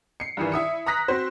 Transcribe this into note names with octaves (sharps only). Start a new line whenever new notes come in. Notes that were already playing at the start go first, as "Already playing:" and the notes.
C7 C#7
G2 D#3 E3
E4 E5 D#6 C#7
A#5 D#6 F#6 A#6 B6
C4 F#4 C5